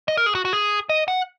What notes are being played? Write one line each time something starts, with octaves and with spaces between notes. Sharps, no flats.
D#5
A#4
G#4
F#4
F#4
G#4
D#5
F#5